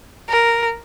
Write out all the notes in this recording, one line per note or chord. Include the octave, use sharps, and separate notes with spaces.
A#4